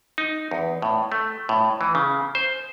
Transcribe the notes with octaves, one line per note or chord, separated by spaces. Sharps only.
D#4
E2
A2
A3
A2
E3
C#3
C5